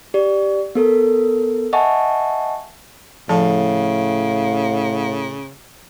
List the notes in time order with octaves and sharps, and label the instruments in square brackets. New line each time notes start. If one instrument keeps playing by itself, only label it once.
[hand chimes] G4 D5
B3 A4 A#4
D#5 E5 F#5 G#5 A5 C#6
[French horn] A2 [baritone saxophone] C#3 [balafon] F3 A4 A5 [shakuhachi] F5